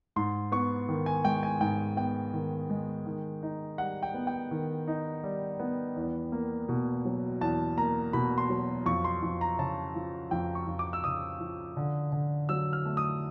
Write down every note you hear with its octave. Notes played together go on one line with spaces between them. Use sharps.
G#2 C6
B3 C#6
D#3
G#5
G#3 G5
G#5
G#2 G5
B3 G5
D#3
G#3
D#3
D#4
G3 F#5
G5
B3
G5
D#3
D#4
G3
B3
E2
A#3
B2
F#3
E2 A5
A#3 A#5
B2 B5
C6
F#3
F2 C#6
C6
F2
A#5
C#3 A5
F3
F2 G5
C#6
F2
D6
E6
C#3 D#6
F3
D3
D3
F#3 E6
F6
A3
D#6